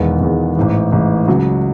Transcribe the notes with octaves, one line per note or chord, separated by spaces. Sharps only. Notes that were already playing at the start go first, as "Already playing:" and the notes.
Already playing: E1 E2 D#3 G#3 B3
E1 E2 D#3 G#3 B3
A1 G#2 E3
A1 G#2 E3
C#2 C#3 F#3